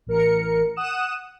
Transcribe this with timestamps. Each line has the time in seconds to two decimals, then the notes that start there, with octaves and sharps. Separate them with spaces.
0.07 A1 A#4 C#7
0.76 F#5 D#6 F#6 E7